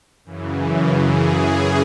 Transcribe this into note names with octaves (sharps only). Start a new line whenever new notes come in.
F#2 C#3 E3
G#4